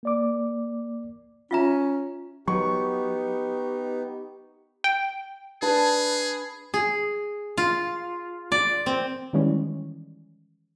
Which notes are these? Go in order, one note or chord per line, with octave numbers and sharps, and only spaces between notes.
A#3 D5 D6
C#4 F4 E5 A#5
F#3 B3 D#4 G4 C#6
G5
D4 G#4 B4 A5
G#4
F4
D5
C4
D#3 E3 G3 G#3 C#4